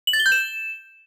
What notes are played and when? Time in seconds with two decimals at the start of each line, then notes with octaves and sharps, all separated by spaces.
0.07 F#7
0.13 A6
0.20 G7
0.26 G6
0.32 E7